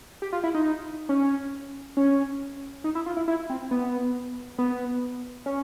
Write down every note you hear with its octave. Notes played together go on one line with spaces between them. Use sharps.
G4
F4
E4
D#4
C#4
C#4
D#4
E4
F4
E4
E4
C4
B3
B3
C#4